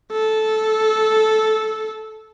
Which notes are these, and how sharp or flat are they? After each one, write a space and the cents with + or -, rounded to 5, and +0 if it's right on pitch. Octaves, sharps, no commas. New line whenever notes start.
A4 -10